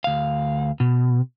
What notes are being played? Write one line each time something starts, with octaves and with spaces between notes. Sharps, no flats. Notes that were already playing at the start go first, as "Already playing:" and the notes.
D2 F5
B2